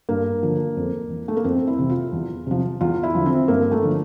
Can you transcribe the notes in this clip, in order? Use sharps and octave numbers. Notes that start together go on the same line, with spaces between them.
G2 A#3
D3 F3
F2
E3
A3
A#3
F2 C4
E4
C3 E3
F4
E2
C3 F3
E2 F4
E4
D3 F3
C4
G2 A#3
A3
D3 F3